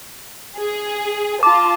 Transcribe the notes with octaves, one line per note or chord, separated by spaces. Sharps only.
G#4
F4 A5 D6